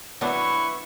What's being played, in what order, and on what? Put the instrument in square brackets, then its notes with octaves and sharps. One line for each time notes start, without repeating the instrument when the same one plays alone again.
[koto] F#3 B3 D4 [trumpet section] E4 B4 C#6